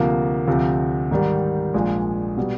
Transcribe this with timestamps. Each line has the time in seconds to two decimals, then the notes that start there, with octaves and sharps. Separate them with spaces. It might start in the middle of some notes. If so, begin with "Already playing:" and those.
Already playing: D2 C3 F3 A#3
0.47 D2 C3 F3
1.11 G#2 D#3 G3
1.74 A#1 A#2 F3 G#3
2.37 B2 G3